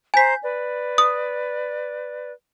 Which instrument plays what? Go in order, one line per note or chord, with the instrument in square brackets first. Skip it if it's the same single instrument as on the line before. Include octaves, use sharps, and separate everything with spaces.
[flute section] C5 A#5 G6 [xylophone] G#5 B6
[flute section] B4 D5
[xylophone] D#6